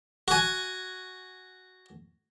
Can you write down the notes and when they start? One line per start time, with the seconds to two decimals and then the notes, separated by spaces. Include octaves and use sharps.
0.28 F#4 G#5